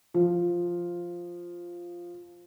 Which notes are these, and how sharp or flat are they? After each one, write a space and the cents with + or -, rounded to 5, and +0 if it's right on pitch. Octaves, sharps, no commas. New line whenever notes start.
F3 +0